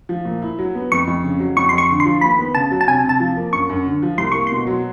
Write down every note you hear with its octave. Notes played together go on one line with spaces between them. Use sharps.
F3
A#2
E4
F#3
B3
F2 C#6
F2
C#3
F#3
F2 C#6
F2 C6
C#6
D3
C6
F3
D#2 B5
B3
C#3 A5
F#3
A5
C3 G#5
C3
A5
F3
A#3
F#2 C#6
F#2
D3
F3
C2 C6
A#3 C#6
B2 C6
F#3